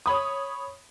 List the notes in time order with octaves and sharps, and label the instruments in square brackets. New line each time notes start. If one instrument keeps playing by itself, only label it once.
[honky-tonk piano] C#5 B5 D#6